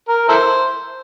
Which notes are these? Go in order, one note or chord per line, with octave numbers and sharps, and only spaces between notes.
A#4
E4 A4 C5